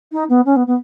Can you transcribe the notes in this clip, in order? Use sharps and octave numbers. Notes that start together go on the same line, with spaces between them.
D#4
B3
C#4
B3
B3